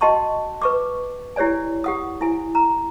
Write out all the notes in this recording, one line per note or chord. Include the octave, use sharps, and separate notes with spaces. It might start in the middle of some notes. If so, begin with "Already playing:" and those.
F#4 D#5 G5 A5 C6 C#6
B4 C#6 D6
E4 G4 C#5 D5 G#5
G4 F#5 D#6
E4 G#5
A#5